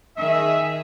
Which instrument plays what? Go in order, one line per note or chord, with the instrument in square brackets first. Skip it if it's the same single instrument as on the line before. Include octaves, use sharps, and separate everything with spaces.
[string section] D#3 G#4 [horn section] E5